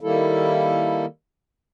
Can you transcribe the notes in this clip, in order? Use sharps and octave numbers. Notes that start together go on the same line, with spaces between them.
D#3 G3 A#3 E4 A4